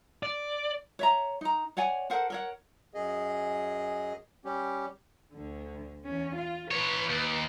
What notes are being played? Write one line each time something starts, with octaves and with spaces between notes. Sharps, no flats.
D5
C#5 E5 A#5
D#4 A#5
C#5 D5 F#5 G#5
A4 A#4 C5 F#5
A#4 C#5 F#5
F#2 G#4 D#5
G3 C#4 G4
D2 D3
E2 C#4
F4
E3 B4 C#5
D#2